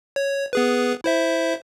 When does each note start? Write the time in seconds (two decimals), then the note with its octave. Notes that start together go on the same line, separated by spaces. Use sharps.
0.16 C#5
0.53 B3 G#4 B4
1.04 E4 C5 E5